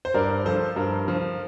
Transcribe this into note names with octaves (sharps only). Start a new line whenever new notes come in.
C5
G2 A#4 D5
F3 A4 C5
G2 A#4
F3